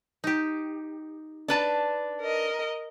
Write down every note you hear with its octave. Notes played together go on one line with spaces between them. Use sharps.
D#4 G4
D4 B4 A5
A#4 D#5